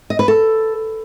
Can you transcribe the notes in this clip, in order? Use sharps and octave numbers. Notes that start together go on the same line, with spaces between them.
D#5
B4
A4